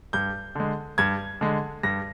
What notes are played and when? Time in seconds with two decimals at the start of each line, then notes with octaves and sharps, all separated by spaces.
0.13 G2 G6
0.55 D3 G#3
0.98 G2 G#6
1.41 D3 G#3
1.83 G2 A#6